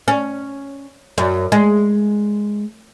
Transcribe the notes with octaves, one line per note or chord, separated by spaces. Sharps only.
C#4
F#2
G#3